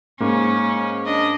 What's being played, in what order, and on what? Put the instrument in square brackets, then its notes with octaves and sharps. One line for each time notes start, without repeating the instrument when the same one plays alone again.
[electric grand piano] G#2 A#3 [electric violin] C#4
[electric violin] D4 D#5